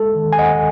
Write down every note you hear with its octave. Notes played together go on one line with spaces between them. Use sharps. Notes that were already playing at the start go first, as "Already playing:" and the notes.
Already playing: G#3 A4
D#3
G#5
D#2 D#5 F#5